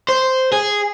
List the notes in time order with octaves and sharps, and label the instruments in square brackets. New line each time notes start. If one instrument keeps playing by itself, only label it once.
[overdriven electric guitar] C5
G#4